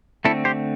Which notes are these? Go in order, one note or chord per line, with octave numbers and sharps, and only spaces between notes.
D3 A3 C4 E4 A4
G4 C5